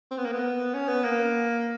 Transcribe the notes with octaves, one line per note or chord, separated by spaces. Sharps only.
C4
B3
A#3
B3
C#4
B3
A#3